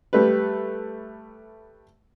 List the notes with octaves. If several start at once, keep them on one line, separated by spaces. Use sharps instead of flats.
G3 A3 B4